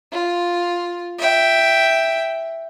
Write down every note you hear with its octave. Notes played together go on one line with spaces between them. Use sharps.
F4
E5 G5